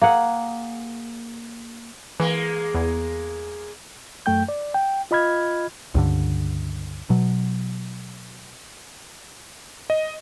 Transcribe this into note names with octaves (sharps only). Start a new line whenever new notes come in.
A#3 G#4 F#5
E3 G#3 A#3
E2
F#2 A3 G5 G6
D5
G5
F4 D#5 B5 F6 G#6
C#2 G2 D3
B2 F#3
D#5